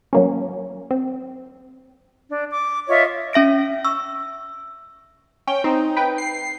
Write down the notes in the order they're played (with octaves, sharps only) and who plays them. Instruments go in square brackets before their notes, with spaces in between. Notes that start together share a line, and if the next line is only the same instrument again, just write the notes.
[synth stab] F#3 A#3 C#4
C4
[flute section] D4
D6
F4 C#5 D#5 E5
[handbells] C#4 E5 A#6 D7
C#6 E6
[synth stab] C#4 [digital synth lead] G5
[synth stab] C4 [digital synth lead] D#4
[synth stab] B4 G5
[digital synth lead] C7